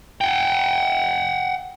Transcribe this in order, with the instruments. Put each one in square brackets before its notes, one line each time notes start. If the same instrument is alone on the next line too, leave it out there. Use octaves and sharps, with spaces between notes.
[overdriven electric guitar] F#5 G5